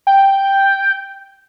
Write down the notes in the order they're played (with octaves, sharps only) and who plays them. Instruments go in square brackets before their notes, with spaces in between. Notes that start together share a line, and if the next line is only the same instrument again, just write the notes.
[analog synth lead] G5